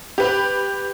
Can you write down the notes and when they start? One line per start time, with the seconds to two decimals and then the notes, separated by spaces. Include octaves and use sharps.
0.18 G4 B4